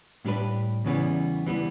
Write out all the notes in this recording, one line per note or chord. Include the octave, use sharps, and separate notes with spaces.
A2 G3 D4 G4 B4
E2 C#3 E3 G3 B3
E3 G3 B3